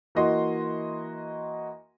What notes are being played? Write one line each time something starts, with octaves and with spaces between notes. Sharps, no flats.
E3 A#3 F#4 D#5 C6